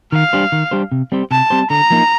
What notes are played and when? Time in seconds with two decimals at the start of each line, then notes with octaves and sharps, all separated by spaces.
0.12 D#3 F5
0.33 G3 D4 G4 C5
0.52 D#3
0.71 G3 D4 G4 C5
0.92 C3
1.12 G3 C4 G4 C5
1.31 C3 A5
1.50 G3 C4 G4 C5
1.70 D3 A#5
1.90 F3 A#3 D#4